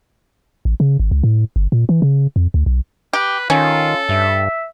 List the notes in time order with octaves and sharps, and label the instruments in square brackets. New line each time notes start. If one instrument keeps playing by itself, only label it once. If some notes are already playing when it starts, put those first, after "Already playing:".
[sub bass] A1
C#3
G#1
C#2
A2
G1
A#2
E3
C#3
F2
D2
B1
[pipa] G4 [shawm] B4
[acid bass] D#3 [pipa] C#4 [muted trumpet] F4 [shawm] A4
[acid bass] G2 [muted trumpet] E5